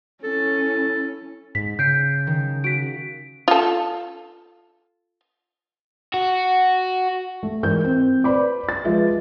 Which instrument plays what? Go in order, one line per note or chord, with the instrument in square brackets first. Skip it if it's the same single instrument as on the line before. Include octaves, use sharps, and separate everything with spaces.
[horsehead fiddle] C#4 E4 [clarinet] A4
[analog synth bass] G#2 [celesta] B6
[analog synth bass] C#3 [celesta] G6 [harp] B6 C7 D7
[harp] D#3
[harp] F#4 [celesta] B6 D7
[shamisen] F4 A4
[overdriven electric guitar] F#4
[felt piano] A3
G#2 E3 A#4 G6
C4
B4 C5 D5 B5 D6
A6
F3 G#3 F4 B4 E5